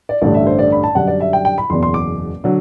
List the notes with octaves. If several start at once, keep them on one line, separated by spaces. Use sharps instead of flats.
D5
A1 G2 D3 A3 D4 D5
E5
C5
D5
B5
A5
F#2 D3 G3 D4 F#5
D5
E5
G5
G5
B5
F#1 E2 B2 C6
C6
D6
D3 F#3